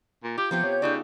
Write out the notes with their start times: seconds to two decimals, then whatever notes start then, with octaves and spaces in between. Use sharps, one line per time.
0.23 A#2
0.38 F4 G4 G6
0.51 C3 F3 B3 F4 G4
0.64 C#5
0.82 C#3 D#4 F4 A4 D5